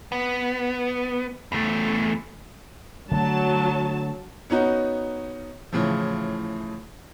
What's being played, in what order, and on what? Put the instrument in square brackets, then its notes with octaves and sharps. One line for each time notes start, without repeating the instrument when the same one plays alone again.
[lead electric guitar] B3
E2 A3
[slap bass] D3 A3 [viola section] F#3 A5
[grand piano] B3 C#4 D#4 F#4
A2 C#3 E3 F3